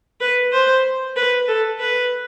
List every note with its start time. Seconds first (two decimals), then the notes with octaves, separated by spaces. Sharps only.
0.21 B4
0.52 C5
1.16 B4
1.48 A4
1.79 B4